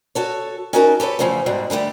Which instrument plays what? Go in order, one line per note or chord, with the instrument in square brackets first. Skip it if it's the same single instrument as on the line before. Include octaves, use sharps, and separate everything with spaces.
[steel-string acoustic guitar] F#4 A4 C#5
C#4 D#4 F#4 A#4 G5 A5
G4 A4 B4 C#5
E2 C#3 F3 G3 A3
G#2 B2 G3 G#3
D3 G3 A3 G4